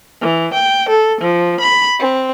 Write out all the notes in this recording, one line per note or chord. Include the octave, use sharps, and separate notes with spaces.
E3
G5
A4
F3
B5
C4